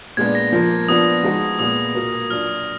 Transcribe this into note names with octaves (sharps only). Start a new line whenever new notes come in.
A#2 G#3 B3 D4 G#6
A#6
F3 A#3 F4
F3 B3 D4 F4 D#6
F3 G#3 D#4 F#4
A#2 G#3 B3 D#6
B2 A#3 F4
F#3 D4 F4 F6